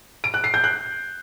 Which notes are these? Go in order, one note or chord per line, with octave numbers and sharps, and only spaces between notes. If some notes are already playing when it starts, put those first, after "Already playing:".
D7
F#6
C7
G6
F#6